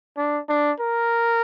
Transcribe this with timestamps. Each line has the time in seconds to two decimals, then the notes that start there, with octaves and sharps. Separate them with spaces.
0.17 D4
0.49 D4
0.81 A#4